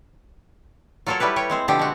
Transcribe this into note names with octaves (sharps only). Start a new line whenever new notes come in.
F#3 F4 A4 A#4 C#5
G3 E4 G4 B4
G4 C#5 G5
G#3 C4 C5
B2 D3 F3 C4 G4
G#3 F#4